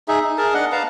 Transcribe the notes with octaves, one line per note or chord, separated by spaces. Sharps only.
D#4 G#4 E5
D#4
G#4 A#4 A5
D4 D#5 F#5
B4 F5 A5 A#5